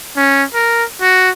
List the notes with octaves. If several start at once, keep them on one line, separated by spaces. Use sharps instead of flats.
C#4
A#4
F#4